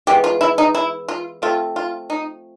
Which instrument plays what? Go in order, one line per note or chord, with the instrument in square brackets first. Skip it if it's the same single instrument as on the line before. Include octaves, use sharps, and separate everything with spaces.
[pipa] E3 G#3 B3 G4
F4
E4
D#4
E4
F4
F3 A3 C4 F4
F4
D#4